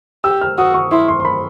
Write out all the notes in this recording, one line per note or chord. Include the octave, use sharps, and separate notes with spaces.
G4 E6
F6
F#4 D#6
C#6
E4 C6
C6
C6
B5